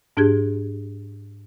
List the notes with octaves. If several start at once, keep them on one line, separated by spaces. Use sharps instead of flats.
G#2 D4 G4 G#4 G#6